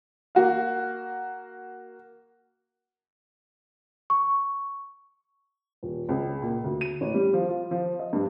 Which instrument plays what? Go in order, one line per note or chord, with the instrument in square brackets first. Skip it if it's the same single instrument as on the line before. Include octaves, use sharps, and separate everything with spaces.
[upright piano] A#3 F#4 F5
[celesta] C#6
[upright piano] D#1
C#2
A#2
D2
D#7
A1
G3
F3
F4
F3
D#5
G2